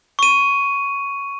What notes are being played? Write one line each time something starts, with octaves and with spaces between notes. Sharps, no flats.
C#6 D#7